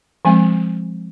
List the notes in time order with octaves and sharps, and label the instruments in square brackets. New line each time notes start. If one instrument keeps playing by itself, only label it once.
[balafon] F3 G#3 C4 G#5